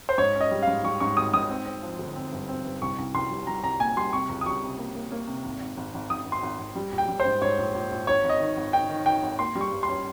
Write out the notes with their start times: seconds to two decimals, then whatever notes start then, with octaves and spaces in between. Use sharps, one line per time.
0.09 C5
0.18 G#2 C#5
0.35 C#4
0.41 D#5
0.51 G3
0.63 F5
0.68 G#2
0.84 G3 C#6
1.00 G#2 C#6
1.17 G#1 D#6
1.33 G#2 D#6
1.50 C4
1.66 C4
1.83 F3
1.99 G1
2.16 C4
2.32 G2
2.49 C4
2.65 G2
2.82 C2 C#6
2.98 C2
3.15 C2 C6
3.30 G3
3.47 G3 A#5
3.64 C2 A#5
3.80 A#2 G#5
3.96 G3 C6
4.13 C3 C#6
4.29 C#2
4.41 D#6
4.46 G3 C#6
4.62 C3
4.78 A#3
4.95 A#3
5.12 A#3
5.27 C3
5.44 G#1
5.61 G#1
5.77 G#1
5.94 G#1
6.10 G#1 D#6
6.26 G#1
6.32 C6
6.43 G#1
6.59 G#1
6.75 G3
6.92 A#1
6.98 G5
7.09 G3
7.20 C5
7.25 G#2
7.41 G#2 C#5
7.58 A#1
7.75 A#1
7.91 A#1
8.07 G#1 C#5
8.24 G#1
8.29 D#5
8.40 D#3
8.57 G#1
8.73 D#3 G5
8.89 D#3
9.06 D#3 G5
9.23 G#1
9.39 A#3 C6
9.55 G3
9.61 C#6
9.71 G2
9.83 C6
9.88 C#4